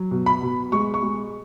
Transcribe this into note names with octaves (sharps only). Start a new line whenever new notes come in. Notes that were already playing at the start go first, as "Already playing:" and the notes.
Already playing: F#3
B2
B5
B2
G#3 C#6
C#6
G#3